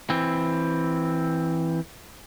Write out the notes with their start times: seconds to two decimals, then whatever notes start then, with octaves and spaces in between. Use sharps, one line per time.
0.10 E3 C4